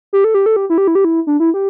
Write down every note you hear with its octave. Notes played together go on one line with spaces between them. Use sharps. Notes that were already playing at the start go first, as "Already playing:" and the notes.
G4
A4
G4
A4
G4
E4
G4
E4
G4
E4
D4
E4
G4